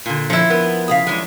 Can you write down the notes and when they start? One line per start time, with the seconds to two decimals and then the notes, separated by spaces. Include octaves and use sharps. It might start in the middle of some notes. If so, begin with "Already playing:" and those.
0.06 A#2 D3
0.30 F3 C4 E4 C#7
0.50 B3 A#4
0.88 E2 C#3 F5 D#6 B6
1.07 F#2 E3 G#3 D4